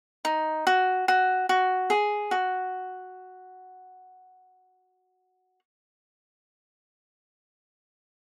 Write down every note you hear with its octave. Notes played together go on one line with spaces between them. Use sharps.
D#4
F#4
F#4
F#4
G#4
F#4